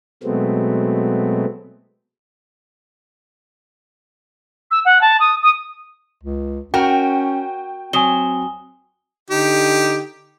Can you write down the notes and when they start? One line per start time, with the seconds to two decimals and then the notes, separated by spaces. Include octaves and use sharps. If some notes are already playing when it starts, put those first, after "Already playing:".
0.23 B2 F#3 G#3 A3 B3 C4
4.71 E6
4.85 F#5
5.01 A5
5.20 D#6
5.42 D#6
6.23 C#2
6.74 C#4 F#4 A#4 G5
7.93 F#3 C4 G#5 D#6 G7
9.30 D3 D#4 G4